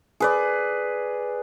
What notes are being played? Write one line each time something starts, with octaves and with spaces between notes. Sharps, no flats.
G#4 B4 D5